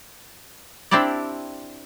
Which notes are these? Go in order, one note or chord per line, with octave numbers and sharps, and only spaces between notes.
C4 D4 E4 G4 D5